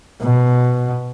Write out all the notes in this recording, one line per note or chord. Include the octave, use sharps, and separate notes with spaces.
B2